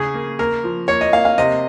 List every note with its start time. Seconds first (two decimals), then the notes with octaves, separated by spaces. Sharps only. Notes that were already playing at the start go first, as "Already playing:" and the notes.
Already playing: C#3 G#4
0.14 A#3
0.39 A#3 A#4
0.64 F3
0.88 A#3 C#5
1.01 D#5
1.13 A#3 F5
1.25 F5
1.38 C3 D#5